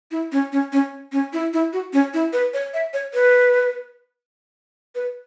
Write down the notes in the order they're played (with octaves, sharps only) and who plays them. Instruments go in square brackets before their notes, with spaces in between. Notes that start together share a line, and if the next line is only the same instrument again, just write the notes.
[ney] E4
C#4
C#4
C#4
C#4
E4
E4
F#4
C#4
E4
B4
C#5
E5
C#5
B4
B4